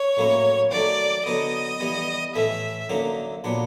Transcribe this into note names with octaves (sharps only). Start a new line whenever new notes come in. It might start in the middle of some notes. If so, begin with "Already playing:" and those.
Already playing: C#5
A2 F#3 A#3 C#4 E4
D#3 F#3 A3 D5
D3 F#3 B3 D#5
E3 G3 B3
A2 E3 A3 E5
F#2 D3 F#3 A#3 D#4
A#2 F#3 B3 D4